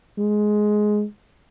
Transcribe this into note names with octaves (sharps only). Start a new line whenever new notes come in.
G#3